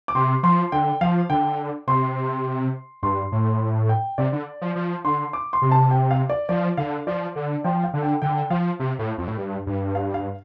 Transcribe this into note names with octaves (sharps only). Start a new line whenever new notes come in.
D6
C3 C6
F3 C6
D3 G5
F3 F5
D3 G5
C3 C6
G2 C6
A2
G5
C3 D5
D3
F3
F3
D3 C6
D6
C6
C3
A5
G5
F5
D5
F3 D5
D3 F5
F3 D5
D3
F3 G5
F5
D3
G5
D3 G5
F3 F5
C3
A2
F2
A2
G2
G2
F5
F5